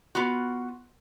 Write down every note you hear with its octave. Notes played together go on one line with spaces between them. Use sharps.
B3 F4 F#4